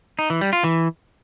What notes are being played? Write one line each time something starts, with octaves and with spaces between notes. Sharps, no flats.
D#4
E3
G3
F4
E3